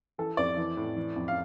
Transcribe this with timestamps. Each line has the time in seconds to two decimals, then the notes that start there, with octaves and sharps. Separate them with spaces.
0.18 E3 A4
0.37 F2 D5
0.57 E3
0.77 A2
0.96 E3
1.16 F2
1.28 F5